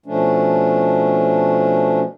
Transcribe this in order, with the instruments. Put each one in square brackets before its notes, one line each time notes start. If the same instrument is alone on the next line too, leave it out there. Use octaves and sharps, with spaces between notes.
[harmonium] B2 F3 A3 C#4 D4